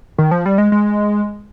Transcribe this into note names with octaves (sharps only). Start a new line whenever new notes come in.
D#3
F3
G3
G#3
G#3